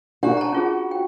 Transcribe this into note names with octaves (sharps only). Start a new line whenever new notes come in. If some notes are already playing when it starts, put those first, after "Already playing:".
D4 F#4 G4
A5 A#5
C#4 F4 G#4
G5